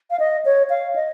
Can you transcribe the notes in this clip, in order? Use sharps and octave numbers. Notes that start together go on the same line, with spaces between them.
F5
D#5
C#5
F5
D#5